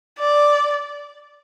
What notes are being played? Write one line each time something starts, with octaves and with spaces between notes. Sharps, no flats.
D5